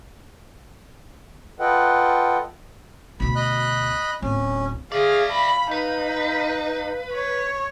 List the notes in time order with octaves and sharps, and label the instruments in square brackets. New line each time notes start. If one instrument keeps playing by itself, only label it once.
[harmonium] F4 A4 B4 D#5 F#5 G5
[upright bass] D2 B2 [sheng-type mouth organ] B5
[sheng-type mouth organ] D#5 B5 F#6
[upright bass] D1 [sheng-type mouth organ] C#4
[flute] G#4 [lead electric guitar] D5 E5 [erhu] F5
[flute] F5 [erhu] B5
[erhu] D#4 [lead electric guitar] B4
[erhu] C#5